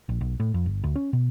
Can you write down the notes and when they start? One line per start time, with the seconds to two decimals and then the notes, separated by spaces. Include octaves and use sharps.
0.09 A#1
0.21 B1
0.40 A2
0.54 F2
0.66 G1
0.84 D2
0.96 C#4
1.13 B2